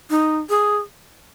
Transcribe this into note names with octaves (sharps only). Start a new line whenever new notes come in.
D#4
G#4